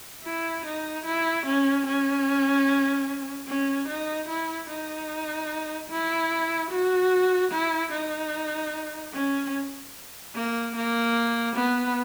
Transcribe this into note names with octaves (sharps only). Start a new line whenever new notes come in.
E4
D#4
E4
C#4
C#4
C#4
D#4
E4
D#4
E4
F#4
E4
D#4
C#4
A#3
A#3
B3